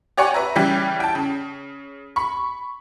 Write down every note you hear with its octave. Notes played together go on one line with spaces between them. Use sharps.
G4 C#5 D5 F#5 G#5 C#6
B4 E5 A#5
C#3 E3 G3 C#4 G4
G5 A5
C#3
B5 C#6